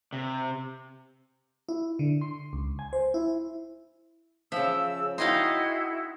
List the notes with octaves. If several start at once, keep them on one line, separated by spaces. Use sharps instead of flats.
C3
E4
D3
C6
C#2
G#5
C5
E4
C#3 F3 E5 E6
D#4 E4 F#4 G#4 D#5 F5 G5 C6